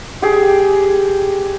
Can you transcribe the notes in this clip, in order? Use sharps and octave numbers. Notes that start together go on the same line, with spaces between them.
G4 G#4